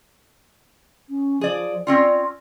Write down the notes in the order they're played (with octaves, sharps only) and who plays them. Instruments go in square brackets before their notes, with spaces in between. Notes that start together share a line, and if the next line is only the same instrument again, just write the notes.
[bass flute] C#4
[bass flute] F3 [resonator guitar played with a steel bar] G#4 D5
[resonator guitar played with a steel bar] C4 C#4 F4 [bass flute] D5